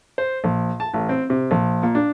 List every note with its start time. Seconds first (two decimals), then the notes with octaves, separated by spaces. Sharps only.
0.18 C5
0.44 A#1
0.80 A5
0.94 A1
1.09 C4
1.30 C3
1.51 A#1
1.83 A#2
1.95 D4